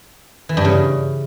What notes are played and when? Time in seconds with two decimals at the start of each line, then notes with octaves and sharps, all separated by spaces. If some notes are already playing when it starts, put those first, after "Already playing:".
0.49 E3
0.57 G2
0.65 C#3